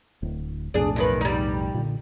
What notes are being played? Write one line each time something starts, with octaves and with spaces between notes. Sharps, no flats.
D1
B1 F2 A2 D4 G#4
F#2 D#3 B4
G3 D#4
A#2 D3